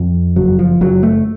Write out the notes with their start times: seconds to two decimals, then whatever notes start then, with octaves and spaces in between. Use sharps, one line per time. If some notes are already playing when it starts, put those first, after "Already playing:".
Already playing: F2
0.36 F#1 F#3
0.59 F3
0.81 F#1 F#3
1.03 A3